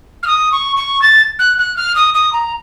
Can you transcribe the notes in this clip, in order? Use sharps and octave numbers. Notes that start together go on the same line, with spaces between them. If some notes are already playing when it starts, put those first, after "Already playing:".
F6
D#6
C#6
C#6
A6
F#6
F#6
F6
D#6
D#6
A#5